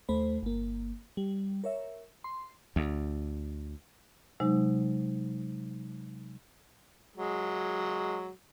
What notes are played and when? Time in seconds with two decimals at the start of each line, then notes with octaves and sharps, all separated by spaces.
0.09 D#2 A3 C5 B5
0.43 G1 A#3
1.17 G3
1.64 A#4 C#5 E5
2.24 C6
2.76 D2
4.40 C3 F#3 G#3 D#4
7.16 F#3 G#3